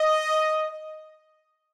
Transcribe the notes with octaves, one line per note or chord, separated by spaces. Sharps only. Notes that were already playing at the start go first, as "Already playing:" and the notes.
Already playing: D#5